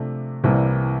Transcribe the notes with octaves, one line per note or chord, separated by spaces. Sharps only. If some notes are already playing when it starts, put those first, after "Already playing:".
Already playing: C3 F3 A3 D4
C2 C3 E3 G3 A#3